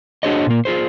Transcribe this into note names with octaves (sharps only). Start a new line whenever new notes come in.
D4 F#4 G#4 C5 C#5 D#5
A#2 A#3
F4 G#4 C5